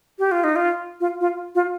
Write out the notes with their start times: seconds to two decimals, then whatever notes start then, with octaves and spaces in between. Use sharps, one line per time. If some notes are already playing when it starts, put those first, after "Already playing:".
0.19 G4
0.32 F4
0.44 D#4
0.56 F4
1.00 F4
1.21 F4
1.55 F4